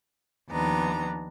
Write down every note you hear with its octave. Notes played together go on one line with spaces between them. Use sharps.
D#2 D#3 F3 B3 D4 A#5